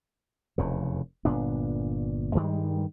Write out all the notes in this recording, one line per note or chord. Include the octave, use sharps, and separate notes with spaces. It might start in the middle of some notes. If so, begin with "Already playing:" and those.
F1 E2 C#3
G1 A#2 B3 D4
G2 D#3 G3 G#3